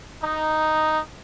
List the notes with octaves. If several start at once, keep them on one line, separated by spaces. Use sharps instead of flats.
D#4